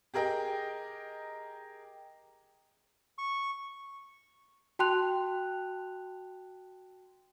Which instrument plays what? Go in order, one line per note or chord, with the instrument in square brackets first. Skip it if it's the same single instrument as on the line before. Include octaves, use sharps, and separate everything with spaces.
[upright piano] G4 G#4 A#4 D#5 G5
[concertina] C#6
[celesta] F#4 G5 A5 C6 F#6 F7